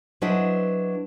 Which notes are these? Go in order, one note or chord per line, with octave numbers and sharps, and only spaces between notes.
F#3 D4 E4 B4 C5 D#5